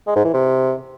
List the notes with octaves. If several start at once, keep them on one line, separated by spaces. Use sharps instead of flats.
G#3
G#2
E3
C3